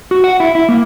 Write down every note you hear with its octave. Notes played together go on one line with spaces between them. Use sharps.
F#4
F#5
E4
E4
A#3